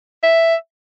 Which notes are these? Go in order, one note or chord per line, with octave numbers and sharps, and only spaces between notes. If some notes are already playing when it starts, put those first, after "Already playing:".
E5